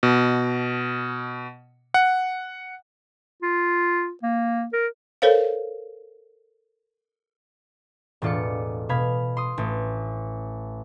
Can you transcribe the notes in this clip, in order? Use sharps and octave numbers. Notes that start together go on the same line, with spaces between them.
B2
F#5
F4
A#3
A#4
A4 A#4 C5 C#5 F5
E1 A2 F4 D5 C#7
B2 F5 B5 G#6
C6 D#6
A1